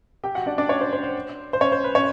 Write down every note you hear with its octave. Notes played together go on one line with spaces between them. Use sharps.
G4 G5
F#4 F#5
D4 D5
D4 D5
C#4 C#5
C5
C5
C5
C5
C#4 C#5
C5
B4
C#4 C#5